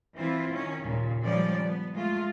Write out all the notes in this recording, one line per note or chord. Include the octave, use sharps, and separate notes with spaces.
E3 C4 E4 F4
D#3 C#4
D#2 A#2 C#3
D#3 F3 G3 G#3 C#4 D5
B3
G#3 A3 F4